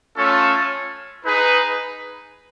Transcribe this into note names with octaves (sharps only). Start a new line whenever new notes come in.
A3 C#4 F4 A4 C#5
D#4 G#4 B4